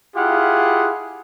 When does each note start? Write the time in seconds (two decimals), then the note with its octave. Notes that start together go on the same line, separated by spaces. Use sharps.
0.16 E4 F4 G4 G#4 F5 F#5